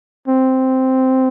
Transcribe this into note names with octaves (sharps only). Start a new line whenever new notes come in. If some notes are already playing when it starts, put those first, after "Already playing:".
C4